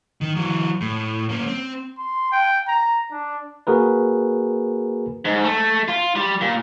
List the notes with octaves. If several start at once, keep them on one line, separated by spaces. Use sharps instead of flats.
D#3
E3 F#3
A2
A#3 C#4
C4
C6
G5
A#5
D4
A#3 F#4 G#4 A#4 B4
G#2
A3
F4
G3
A#2